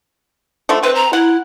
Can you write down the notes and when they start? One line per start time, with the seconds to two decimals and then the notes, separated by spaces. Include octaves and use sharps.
0.69 D3 F3 A3
0.83 C4 B4
0.95 A#5
1.13 E4 F#5